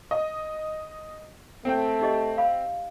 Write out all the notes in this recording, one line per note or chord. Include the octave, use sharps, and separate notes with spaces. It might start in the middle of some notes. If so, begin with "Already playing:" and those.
D#5
A3 C4 G5
D#4 G4 D#5
F5 B5